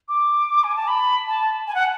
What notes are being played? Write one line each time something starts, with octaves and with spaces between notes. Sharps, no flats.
D6
G#5
A5
B5
A5
G#5
F#5